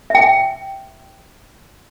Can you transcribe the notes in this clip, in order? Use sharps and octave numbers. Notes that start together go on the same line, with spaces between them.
E5 G5